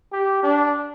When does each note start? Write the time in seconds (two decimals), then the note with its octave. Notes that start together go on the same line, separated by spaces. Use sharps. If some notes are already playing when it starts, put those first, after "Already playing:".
0.13 G4
0.43 D4